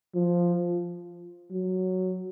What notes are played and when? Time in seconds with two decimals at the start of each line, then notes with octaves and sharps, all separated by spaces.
0.15 F3
1.51 F#3